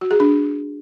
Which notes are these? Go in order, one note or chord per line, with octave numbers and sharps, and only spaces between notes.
F#4
G#4
D4